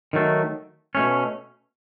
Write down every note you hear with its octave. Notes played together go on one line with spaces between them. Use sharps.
D#3 F#3 A3
B2 A3 C#4